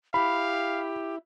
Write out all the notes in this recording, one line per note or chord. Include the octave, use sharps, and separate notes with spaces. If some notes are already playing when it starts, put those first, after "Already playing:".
E4 G4 F5 B5